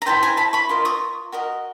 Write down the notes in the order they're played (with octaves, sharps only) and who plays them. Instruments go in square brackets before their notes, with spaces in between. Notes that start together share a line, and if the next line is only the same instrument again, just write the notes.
[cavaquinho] A#5
E4 A4 C5 G5 A5
G#5 A#5
A5 B5
B5 C#6
F4 A#4 D#5
C#6 D#6
F#4 A#4 D#5